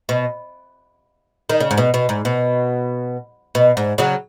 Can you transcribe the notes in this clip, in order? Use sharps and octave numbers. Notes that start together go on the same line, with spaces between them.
B2
D#3
C#3
G#2
B2
B2
G#2
B2
B2
G#2
C#3 F#3